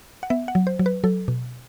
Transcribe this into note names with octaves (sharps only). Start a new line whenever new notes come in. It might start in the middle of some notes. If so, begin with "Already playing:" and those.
F#5
B3 E5
F#5
F#3
C5
F#3
B4
F#3 A4
B2